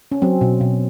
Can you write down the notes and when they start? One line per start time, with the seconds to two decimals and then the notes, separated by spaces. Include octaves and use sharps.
0.12 C#4
0.22 F#3 C4
0.41 B2
0.61 B2